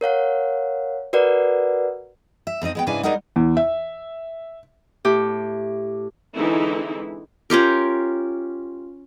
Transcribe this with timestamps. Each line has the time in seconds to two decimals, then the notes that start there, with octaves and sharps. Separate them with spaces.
0.01 A#4 C#5 F5 F#5
1.13 F#4 A#4 B4 D5 F#5
2.47 E5
2.61 F2 C4 D#4 D#5
2.75 G#3 B3 G5
2.87 G#2 C#3 D4 E4 B4 G#5
3.03 G3 G#3 D#4 A#4 D#5 F#5
3.36 E2
3.57 E5
5.05 A2 G4
6.36 D3 E3 G#3 C4 D#4 E4
7.50 C#4 F4 G4 A#4